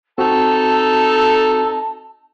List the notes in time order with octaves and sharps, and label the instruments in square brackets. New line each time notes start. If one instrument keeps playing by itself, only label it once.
[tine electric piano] C4 F#4 [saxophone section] D#4 A4 [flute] A5